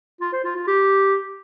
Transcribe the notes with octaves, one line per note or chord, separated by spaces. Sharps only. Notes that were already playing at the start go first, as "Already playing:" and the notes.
F4
C5
F4
F4
G4